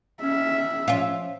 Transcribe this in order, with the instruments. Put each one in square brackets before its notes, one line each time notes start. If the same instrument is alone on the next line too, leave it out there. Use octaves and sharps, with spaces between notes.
[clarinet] C#4 [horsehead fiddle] E5
[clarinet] F3 [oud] C#4 F4